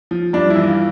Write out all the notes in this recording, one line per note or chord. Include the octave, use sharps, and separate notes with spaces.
F3
G2 D4
E4
E3
F4